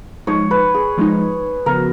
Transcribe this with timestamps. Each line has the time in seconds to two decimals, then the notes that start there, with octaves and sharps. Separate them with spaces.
0.27 F3 G#3 D#4 C#5
0.51 B4
0.74 G#4
0.98 F3 G#3 D#4
1.66 C#3 F3 B3 F#4 A#4